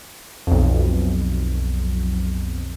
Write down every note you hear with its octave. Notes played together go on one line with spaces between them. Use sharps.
B1 F2